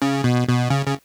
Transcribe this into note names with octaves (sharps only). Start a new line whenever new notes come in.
C#3
B2
B2
C#3
C#3